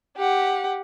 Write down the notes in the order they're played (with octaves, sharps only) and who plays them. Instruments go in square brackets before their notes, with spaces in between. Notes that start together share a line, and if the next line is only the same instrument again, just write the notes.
[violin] G4 F#5